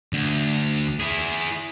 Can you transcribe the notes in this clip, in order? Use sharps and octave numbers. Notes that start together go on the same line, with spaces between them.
D2
E4 G#4